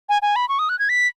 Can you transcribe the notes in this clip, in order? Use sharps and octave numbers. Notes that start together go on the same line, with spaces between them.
G#5
G#5
B5
C#6
D#6
F#6
G#6
B6